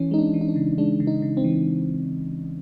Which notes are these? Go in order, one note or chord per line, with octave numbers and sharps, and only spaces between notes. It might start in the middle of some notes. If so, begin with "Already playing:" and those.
Already playing: E3 C#4
G#3 D#4
D4
E3
D#4
D4
C#3
G#3 D4
C#3
D#4
C#3
C4
E3